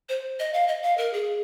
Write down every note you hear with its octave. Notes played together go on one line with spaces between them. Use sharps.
C5
D#5
F5
D#5
F5
A#4
G#4